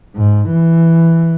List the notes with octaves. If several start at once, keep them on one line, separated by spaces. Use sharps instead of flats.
G#2
E3